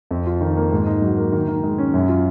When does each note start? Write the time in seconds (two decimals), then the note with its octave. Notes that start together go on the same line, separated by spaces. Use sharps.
0.11 F2
0.27 F4
0.41 D#3
0.57 A#3
0.72 G#2
0.86 D#4
1.02 F#3
1.18 A#3
1.32 D#3
1.48 D#3
1.63 G#3
1.78 C#4
1.94 F#2
2.09 F4